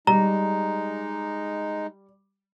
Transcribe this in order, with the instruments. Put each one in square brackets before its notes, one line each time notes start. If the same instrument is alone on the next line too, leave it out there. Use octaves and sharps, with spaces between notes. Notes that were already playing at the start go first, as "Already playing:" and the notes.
[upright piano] G3 [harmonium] G#3 D#4 [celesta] A#5